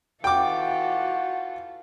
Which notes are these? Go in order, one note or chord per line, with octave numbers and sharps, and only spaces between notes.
E3 F4 F#4 A4 G5 D6